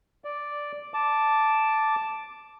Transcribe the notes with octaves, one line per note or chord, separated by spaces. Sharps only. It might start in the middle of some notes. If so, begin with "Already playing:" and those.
D5
A5 D6